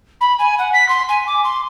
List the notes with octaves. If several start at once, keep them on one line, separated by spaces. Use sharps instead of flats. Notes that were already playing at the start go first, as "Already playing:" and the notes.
B5
G#5
F#5
B6
C6
G#5
D6
C6